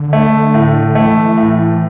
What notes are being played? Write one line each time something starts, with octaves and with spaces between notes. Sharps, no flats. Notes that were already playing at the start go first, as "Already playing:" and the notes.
Already playing: D3
A3
A2
E3 A3
E3
A2